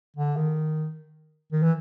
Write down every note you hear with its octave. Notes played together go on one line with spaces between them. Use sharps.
D3
D#3
D#3
E3